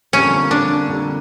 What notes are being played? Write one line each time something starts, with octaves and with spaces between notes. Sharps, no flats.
F2 D3 G3 A#3 C#4
D4
F2 D3 G3 A#3